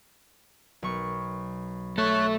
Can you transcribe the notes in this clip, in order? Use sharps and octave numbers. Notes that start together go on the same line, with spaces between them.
B1 C#6
A3 A4 C#5 F#6